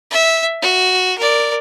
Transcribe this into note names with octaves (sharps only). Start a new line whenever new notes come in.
E5
F#4
A#4 D5